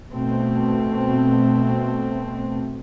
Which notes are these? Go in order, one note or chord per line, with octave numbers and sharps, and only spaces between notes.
B2 A3 C4